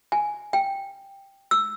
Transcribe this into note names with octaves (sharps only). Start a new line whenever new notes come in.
G#5
G5
E6